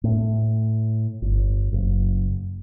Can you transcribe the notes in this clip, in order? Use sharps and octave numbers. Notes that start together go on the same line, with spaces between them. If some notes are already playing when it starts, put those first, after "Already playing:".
A2
G1
F#1